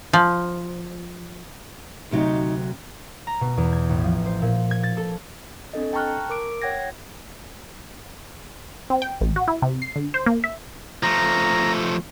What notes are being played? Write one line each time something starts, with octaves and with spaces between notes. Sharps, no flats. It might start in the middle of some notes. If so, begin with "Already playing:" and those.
F3
D2 C3 F#3 D#4
A#5
B2
E2
G#6
A1
F3
C5
A#2
G#6
A6
A4
C4 D4 A4 D#5
G5 A5 A#5 C#6 F6 F#6
A#4 D6 D7
C#5 F#5 G5 G#6 A#6
C4
G5
A1
F#4
E4
C3
C7
D3
C5
A#3
E5
F3 A3 A#5